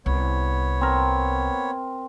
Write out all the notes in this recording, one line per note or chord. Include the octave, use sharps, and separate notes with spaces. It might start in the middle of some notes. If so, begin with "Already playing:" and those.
C2 B3 C#5
C4 A#4